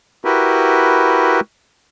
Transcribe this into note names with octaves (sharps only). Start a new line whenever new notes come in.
E4 F#4 G4 A#4 B4